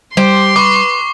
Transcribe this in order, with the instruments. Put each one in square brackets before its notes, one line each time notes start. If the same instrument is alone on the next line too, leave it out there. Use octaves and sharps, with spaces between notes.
[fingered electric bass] G3 [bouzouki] G4 C5 [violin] C6
[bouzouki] B4 [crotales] C#6 D6